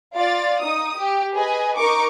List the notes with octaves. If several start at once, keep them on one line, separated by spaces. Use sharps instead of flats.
F4 D5 F5 A6
D#4 D#6
G4
G#4 B4 D#5 G#5
D#4 A#4 C#6 D6